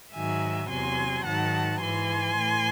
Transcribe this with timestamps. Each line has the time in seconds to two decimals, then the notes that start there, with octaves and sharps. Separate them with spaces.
0.13 G#2 D#3 F#3 E5 G#5
0.69 E2 C3 F#3 G#5 C6
1.25 G#2 D#3 F#3 F#5 A5
1.80 G#2 E3 G#5 C6
2.37 A2 E3